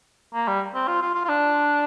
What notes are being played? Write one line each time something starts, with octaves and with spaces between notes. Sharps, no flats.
A#3
G3
C4
F4
F4
F4
F4
D4